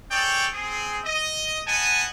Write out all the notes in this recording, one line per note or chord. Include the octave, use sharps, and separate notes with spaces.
G#4 A4 C#5 D5 G5
C4 G#4
D#5
B3 D#5 F#5 G#5 A5